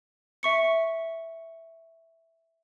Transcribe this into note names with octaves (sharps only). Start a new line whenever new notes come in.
E5 C#6 C#7